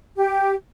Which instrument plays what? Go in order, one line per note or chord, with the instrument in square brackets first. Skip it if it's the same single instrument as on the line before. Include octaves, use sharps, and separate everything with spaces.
[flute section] G4